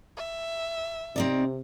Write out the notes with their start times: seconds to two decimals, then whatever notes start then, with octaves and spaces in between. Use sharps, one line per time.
0.17 E5
1.16 C3 C4 D#4 D5